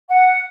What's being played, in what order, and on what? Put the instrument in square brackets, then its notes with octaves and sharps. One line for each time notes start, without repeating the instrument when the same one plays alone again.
[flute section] F#5